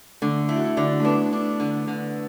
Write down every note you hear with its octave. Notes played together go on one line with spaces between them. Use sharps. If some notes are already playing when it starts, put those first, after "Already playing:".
D3 A3
A3 E4
F#4
E4
D3 D4
A3
B3 D4
D4
D3
D3